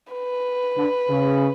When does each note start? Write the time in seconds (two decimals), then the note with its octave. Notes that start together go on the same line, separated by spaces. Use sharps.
0.13 B4
0.77 D3
1.09 C#3